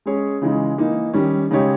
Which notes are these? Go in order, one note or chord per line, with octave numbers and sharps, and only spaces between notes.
G#3 C#4 G#4 C#5
C#3 E3 G#3 D#4
E3 A#3 D#4
D#3 G3 C#4
C#3 G#3 D#4 G4 C#5